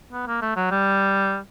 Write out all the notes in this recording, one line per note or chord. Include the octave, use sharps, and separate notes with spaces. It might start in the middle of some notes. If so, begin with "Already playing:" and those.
B3
A#3
A3
F#3
G3